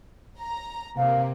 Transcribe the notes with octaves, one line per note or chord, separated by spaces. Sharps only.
A#5
C3 A#3 F5